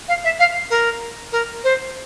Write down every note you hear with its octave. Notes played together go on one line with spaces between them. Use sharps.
F5
E5
F5
A#4
A#4
C5